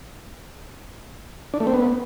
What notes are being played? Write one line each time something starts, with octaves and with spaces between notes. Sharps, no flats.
D4
A3
C4
B3